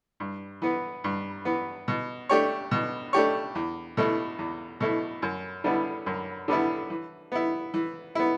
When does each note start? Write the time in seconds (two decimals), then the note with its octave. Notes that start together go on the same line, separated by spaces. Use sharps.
0.20 G2
0.62 E3 B3
1.04 G2
1.45 E3 B3
1.88 B2
2.29 A3 D4 G4 C#5
2.71 B2
3.13 A3 D4 G4 C#5
3.55 E2
3.97 B2 A3 E4
4.39 E2
4.80 B2 A3 E4
5.22 F#2
5.64 D3 G3 B3 E4
6.06 F#2
6.48 D3 G3 B3 E4
6.90 E3
7.32 B3 E4
7.74 E3
8.15 B3 E4